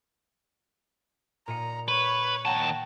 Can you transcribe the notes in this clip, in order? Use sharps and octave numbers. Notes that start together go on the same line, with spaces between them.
A#2 D#5 A#5 C#7
B4 C#5
D#2 F#5 G5 A5 A#5